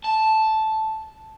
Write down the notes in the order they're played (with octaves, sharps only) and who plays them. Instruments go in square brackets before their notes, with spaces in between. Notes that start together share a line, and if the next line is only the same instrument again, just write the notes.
[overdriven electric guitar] A5